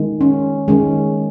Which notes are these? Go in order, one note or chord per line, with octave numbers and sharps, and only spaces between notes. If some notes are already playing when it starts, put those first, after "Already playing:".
Already playing: D#3 G#3
C#4
D#3 G#3 C#4